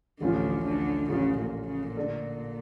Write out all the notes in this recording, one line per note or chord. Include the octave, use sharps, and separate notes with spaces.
A1 D2 A2 D3 F3 C#4 F4
D2 D3
A1 A2 C#3 F3 C#4 F4
A#2
C#3
A#2 D3 A3 D4 A4 D5